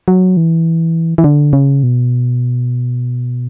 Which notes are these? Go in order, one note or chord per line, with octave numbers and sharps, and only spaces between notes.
F#3
E3
E3
D3
C#3
B2